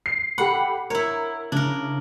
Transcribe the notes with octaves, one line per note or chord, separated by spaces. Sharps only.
C7
G4 A4 F#5 B5
E4 A#4 C#5
C#3 D4 A#4